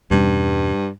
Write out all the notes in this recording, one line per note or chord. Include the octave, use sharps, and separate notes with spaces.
E2 G2 B2 G3 C#4